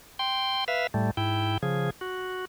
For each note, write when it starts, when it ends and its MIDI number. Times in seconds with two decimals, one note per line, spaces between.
0.19 0.64 79
0.19 0.64 84
0.68 0.87 71
0.68 0.87 76
0.68 0.87 77
0.94 1.11 45
0.94 1.11 55
0.94 1.11 57
1.17 1.58 44
1.17 1.58 64
1.17 1.58 79
1.63 1.90 49
1.63 1.90 53
1.63 1.90 68
2.01 2.45 66